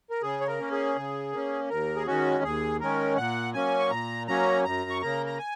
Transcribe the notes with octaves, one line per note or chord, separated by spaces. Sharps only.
A#4
C#3 G#4
C#5
A#4
A#3 C#4
G#4
C#3
A#3 C#4
D#2 A#4
G#4
D#3 G#3 C#4 F#4
D#2 G#4
D#3 G#3 C#4 A#4
A#2 F#5
F#3 A#3 C#4 G#5
C#6
A#2 A#5
F#3 A#3 C#4 A#5
F#2 A#5
C#6
C#3 A#3 A#5
A#5
G#5